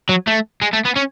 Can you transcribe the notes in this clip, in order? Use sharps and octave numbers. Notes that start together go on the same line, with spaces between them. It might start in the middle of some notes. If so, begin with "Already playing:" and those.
F#3
A3
G#3
A3
B3
C#4